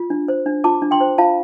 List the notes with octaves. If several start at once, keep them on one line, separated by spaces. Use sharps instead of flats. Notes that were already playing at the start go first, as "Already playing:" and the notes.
Already playing: F4
D4
C5
D4
F4 A5 D6
D4
G5 C6
C5
F4 F5 A5